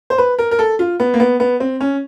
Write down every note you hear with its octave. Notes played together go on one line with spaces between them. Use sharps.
C5
B4
A#4
A#4
A4
F4
B3
A#3
B3
B3
C4
C#4